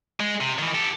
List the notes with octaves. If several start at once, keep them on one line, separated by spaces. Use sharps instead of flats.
G#3
C3
D#3 E3
G4 A4